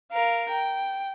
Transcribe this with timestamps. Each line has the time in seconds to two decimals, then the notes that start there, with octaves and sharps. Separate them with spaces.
0.12 A#4 F5
0.49 G5